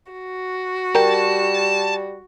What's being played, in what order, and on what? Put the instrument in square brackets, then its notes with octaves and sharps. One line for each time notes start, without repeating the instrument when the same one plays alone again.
[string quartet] F#4
[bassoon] G3 [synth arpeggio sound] A#4 G5 [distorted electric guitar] A5